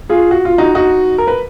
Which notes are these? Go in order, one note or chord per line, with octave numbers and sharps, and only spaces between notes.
F4 G#4
F#4
F4
D#4 F#4
D#4 F#4
A#4
B4